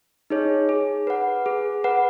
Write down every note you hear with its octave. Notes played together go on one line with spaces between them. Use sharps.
D#4 G#4 C#5
G#4
B4 F#5
G#4
B4 F#5